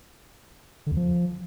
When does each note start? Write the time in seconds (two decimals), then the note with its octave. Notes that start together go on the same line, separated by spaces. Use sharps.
0.87 D3
0.92 E2
0.97 F3